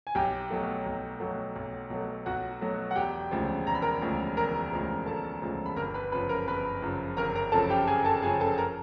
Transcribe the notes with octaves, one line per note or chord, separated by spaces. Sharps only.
G#5
B1 G4 G5
B2 F#3 A3
B1
B2 F#3 A3
B1
B2 F#3 A3
B1 F#4 F#5
B2 F#3 A3
F#5
E1 G4 G5
D2 C#3 F3 G#3
E1 A#5
B5
A#4 A#5
D2 C#3 F3 G#3
E1 A#4 A#5
D2 C#3 F3 G#3
E1 A4 A5
D2 C#3 F3 G#3
B5
G1 A#4 A#5
B4 B5
F#2 C#3 F3 B4 B5
A#4 A#5
G1 B4 B5
F#2 C#3 F3
G1 A#4 A#5
A#4 A#5
F#2 C#3 F3 A4 A5
G4 G5
G1 G#4 G#5
A4 A5
F#2 C#3 F3 G#4 G#5
A4 A5
A#4 A#5